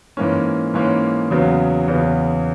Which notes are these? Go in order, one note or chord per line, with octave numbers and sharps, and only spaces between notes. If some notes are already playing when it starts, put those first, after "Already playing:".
G#2 E3 A#3 C#4
G#2 E3 A#3 C#4
E2 C#3 F#3 B3
E2 C#3 F#3 B3